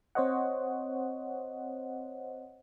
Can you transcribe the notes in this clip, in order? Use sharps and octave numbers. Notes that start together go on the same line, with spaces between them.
C4 C5 C#5 D#5 F#5